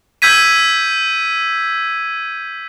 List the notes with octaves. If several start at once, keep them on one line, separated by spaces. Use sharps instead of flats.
E6 G6 G#6 B6 D#7